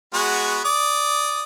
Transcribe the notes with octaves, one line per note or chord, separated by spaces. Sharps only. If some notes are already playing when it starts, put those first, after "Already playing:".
G#3 B3 F#4
D5 D#6